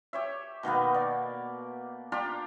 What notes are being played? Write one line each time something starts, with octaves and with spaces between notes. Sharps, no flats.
G4 C#5 E5
B2 D#3 A#3 B3
D5
D4 F4 G4 A#5